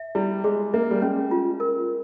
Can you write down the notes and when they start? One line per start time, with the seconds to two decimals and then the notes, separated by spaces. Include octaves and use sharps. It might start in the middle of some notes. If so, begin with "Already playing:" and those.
Already playing: E5
0.15 G3 E4
0.44 G#3 G#4
0.73 A#3 E5
0.91 G3
1.02 G#3 C#4
1.31 F4
1.60 A#4